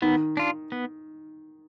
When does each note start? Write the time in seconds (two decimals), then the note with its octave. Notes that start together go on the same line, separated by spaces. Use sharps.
0.02 D#3 B3
0.37 D4 F4
0.72 B3